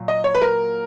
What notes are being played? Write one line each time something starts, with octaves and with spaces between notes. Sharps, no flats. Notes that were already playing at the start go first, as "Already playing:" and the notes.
Already playing: A#2 F#3
D#5
C#5
B4
A#4